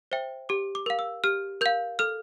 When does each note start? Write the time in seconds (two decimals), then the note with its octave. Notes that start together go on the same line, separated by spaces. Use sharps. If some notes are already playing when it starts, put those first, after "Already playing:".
0.12 C5 E5 G5
0.49 G4 D6
0.75 D6
0.86 A#4 F5
0.99 E6
1.24 G4 F6
1.61 A#4 F5 G6
1.99 A4 F6